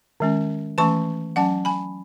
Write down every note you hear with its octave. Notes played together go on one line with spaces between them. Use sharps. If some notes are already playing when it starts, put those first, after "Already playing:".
D#3 G#3 C#4
E3 A3 C#4 A5 C#6
F#3 C#4 F#5 A5
G#5 B5